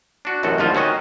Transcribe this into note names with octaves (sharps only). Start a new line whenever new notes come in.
D4 F#4
A1 F#2 C3 F#4 A4
D#2 A2 D3 F3 F4 C5
D#3 C#4 F#4 D#5